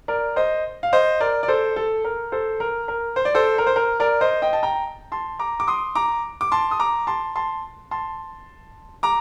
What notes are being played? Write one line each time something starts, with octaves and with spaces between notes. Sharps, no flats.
A#4 D5
C5 D#5
F5
C5 D#5
A#4 D5
D5
A4 C5
A4
A#4
A4 C5
A#4
A#4
C5
D5
A4 C5
A#4
C5
A#4
A#4 D5
C5 D#5
D#5 G5
A5
G5 A#5
A5 C6
A#5 D6
D6
C6 D#6
A#5 D6
D6
A5 C6
D#6
A#5 D6
A5 C6
A5 C6
A5 C6
A#5 D6